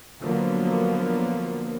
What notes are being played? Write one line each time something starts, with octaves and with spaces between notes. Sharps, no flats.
D3 F3 F#3 A#3 B3